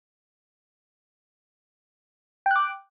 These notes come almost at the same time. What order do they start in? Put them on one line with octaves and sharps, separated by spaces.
G5 F#6 D6